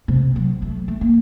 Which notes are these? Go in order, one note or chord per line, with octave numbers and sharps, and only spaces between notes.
C3
F#3
A3
A3
A#3